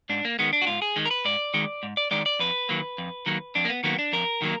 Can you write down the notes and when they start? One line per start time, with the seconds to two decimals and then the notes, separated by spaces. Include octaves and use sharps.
0.09 G#2 D4
0.25 A#3
0.39 D#3 G#3 B3
0.53 D4
0.62 F#4
0.67 G#2 F4
0.82 G#4
0.96 D#3 G#3
1.05 A#4
1.11 B4
1.25 G#2 D5
1.54 D#3 G#3
1.83 G#2
1.97 D5
2.11 D#3 G#3 D5
2.26 D5
2.39 F2 B4
2.69 D#3 F#3 A#3
2.98 F2
3.26 D#3 F#3 A#3
3.55 F2 D4
3.65 A#3
3.70 B3
3.84 D#3 F#3 A#3 B3
3.99 D4
4.13 F2 A#4
4.42 D#3 F#3 A#3